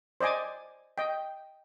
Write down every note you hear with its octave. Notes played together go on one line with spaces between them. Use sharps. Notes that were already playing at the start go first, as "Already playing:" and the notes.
C5 D5 D#5 G#5 D6
D#5 G5